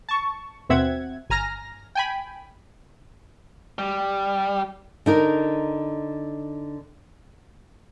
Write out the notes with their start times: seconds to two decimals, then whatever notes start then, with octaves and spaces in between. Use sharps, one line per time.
0.09 A5 C#6
0.69 D#2 B2 C4 E5 F#5 G#6
1.30 G1 G#5 A#5 F6 A#6
1.95 G5 G#5 B5
3.79 G3
5.06 D3 D#4 A#4